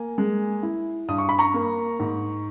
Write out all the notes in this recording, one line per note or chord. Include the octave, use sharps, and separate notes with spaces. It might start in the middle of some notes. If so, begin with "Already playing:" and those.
Already playing: A#3 G#5
G#3
E4
G2 D#6
C#6
B5
A#5 C#6
A#3
G#2